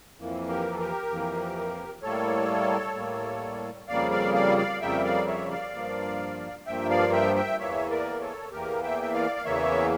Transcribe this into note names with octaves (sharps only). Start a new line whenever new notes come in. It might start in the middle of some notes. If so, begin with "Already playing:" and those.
F2 E3 A#3
G4 A#4
A4
G4 A#4
F2 E3 A#3
A2 G3 A#3 A4 C#5
A2 G3 A#3
F2 C#3 G3 A#3 D5 F5
D5 F5
D5 F5
D5 F5
F2 C#3 G3 A#3 E5 G5
D5 F5
C#5 E5
D5 F5
G2 F3 A#3
G2 F3 A#3 E5 G5
D5 F5
E5 G5
E5 G5
E2 E3 A#3 C#5 E5
A#4 D5
A4 C#5
E2 E3 A#3 G4 A#4
E5 G5
E5
D5 F5
F5
E2 C#3 E3 A#3 C#5 E5